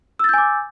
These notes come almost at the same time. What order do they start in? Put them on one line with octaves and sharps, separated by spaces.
E6 A6 G6 G#5 D6